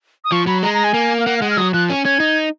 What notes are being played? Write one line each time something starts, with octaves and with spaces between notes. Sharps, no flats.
D#6
F3 C#6
F#3 B5
G#3 A#5
A#5
G#5
A#3
F5
A#3 F#5
F5
G#3 F#5
F6
F#3 D#6
F3 F#6
C#4
C#4 G#6
D#4